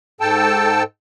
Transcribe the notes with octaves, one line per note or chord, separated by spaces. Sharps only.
G#2 A4 G5 A5 E6